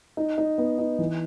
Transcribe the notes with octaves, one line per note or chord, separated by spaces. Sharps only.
D#4
D#4
B3
D#4
E3